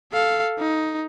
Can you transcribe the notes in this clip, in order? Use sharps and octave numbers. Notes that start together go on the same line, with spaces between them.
A4 F5
D#4